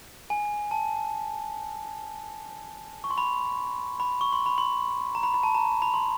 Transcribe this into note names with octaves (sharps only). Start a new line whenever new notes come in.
G#5
A5
C#6
C6
B5
B5
C#6
C6
B5
C6
A#5
B5
B5
A5
A#5
B5
C6